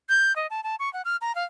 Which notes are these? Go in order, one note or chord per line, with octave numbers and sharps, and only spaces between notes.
G6
D#5
A5
A5
C#6
F#5
F6
A#5
F5